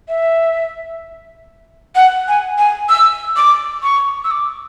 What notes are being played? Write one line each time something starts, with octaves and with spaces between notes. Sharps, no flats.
E5
F#5
G#5
G#5
E6
D6
C#6
E6
D6